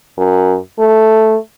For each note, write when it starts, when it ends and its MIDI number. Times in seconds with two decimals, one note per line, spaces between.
0.17 0.56 42
0.79 1.37 57